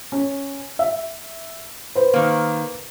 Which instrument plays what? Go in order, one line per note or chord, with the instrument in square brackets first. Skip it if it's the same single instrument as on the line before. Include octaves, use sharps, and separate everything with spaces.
[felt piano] C#4
E5
B4 C5
[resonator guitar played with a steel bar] D#3 A#3